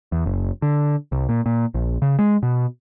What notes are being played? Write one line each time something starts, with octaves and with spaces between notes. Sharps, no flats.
E2
F#1
D3
C2
A#2
A#2
A#1
C#3
G#3
B2